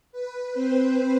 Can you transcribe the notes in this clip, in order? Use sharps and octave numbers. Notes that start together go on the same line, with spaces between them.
B4
C4 C5